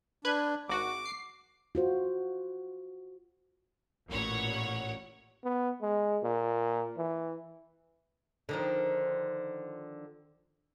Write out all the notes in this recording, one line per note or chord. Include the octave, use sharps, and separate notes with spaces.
D4 B4 F#6 G#6
G#1 F#4 D6
C7
F4 F#4 C5
A1 A#2 C#5 F#5
B3
G#3
A#2
E3
D3 D#3 F3